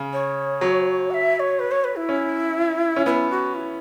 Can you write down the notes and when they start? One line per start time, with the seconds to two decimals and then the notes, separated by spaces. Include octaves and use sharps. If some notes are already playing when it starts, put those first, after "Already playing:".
Already playing: C#3
0.13 C#5
0.61 F#3
1.11 F#5
1.14 E5
1.36 E5
1.40 C#5
1.59 B4
1.71 C#5
1.84 B4
1.96 E4
2.09 C#4
2.96 C#4
3.06 B3 E4
3.31 F#4
3.55 E4